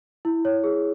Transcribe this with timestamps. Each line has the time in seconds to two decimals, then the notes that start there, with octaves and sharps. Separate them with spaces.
0.25 E4
0.45 C#5
0.64 G#4